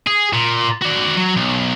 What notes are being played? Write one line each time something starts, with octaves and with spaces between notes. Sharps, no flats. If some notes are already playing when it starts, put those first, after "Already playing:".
G#4
A#2
F#4 D5
F#3
B1